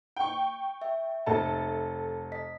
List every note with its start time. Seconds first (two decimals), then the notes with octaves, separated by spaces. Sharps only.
0.16 G5 C#6
0.82 E5
1.26 F1 A4 A5
2.32 D#5 B6